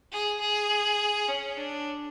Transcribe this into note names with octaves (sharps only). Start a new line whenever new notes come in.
G#4
G#4
C#4
D4